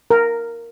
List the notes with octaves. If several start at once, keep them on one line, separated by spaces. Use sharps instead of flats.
A#4